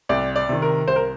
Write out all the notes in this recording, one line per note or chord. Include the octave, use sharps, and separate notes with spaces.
C2 D5
D5
C3 D#3
A#4
C2 C5
A#4